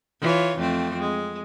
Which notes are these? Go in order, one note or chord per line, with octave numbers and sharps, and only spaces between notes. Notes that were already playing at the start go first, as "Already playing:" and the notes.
E3 F4 C#5
F2 A3 C4
G#3